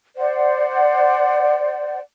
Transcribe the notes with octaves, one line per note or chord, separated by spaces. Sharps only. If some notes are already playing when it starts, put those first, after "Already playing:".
C5 D5 F#5